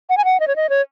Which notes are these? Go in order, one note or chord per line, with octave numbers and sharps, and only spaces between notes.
F#5
G#5
F#5
D#5
C#5
D#5
C#5